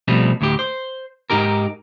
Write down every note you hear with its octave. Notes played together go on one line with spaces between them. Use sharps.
B2 F3 G3 A3 C4
D2 A2 G4
C5
G#2 D#4 G4 A#4